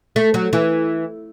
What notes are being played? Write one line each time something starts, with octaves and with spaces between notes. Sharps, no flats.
A3
F#3
E3